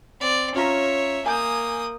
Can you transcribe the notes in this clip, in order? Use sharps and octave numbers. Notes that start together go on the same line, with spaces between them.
C4 D5
C#4 F4 C#5 E5 A#5
A#3 G#5 D#6 G6